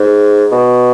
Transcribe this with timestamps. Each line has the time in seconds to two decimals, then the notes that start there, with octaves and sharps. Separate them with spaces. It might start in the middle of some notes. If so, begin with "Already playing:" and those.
Already playing: G#2
0.52 B2